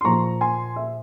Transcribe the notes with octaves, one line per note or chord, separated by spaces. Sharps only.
C6
A#2 F3 A#5 C#6
G#5 C6
E5